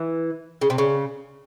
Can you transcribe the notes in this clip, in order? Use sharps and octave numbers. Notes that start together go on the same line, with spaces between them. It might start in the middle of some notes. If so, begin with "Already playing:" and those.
Already playing: E3
C#3
C3
C#3